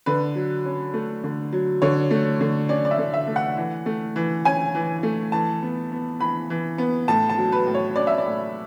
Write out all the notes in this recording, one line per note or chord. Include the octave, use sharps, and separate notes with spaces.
D3 B4
F#3
C#4
A3
D3
F#3
D3 C#5
A3
D3
C#4 D5
D5
E5
D3
E5
A3
F#5
E3
A3
E3
C#4 G#5
E3
A3
E3 A5
B3
B3
E3 B5
E3
B3
A2 A5
A5
F#3
B4
A2
C#5
C#4 D5
E5
D5
A2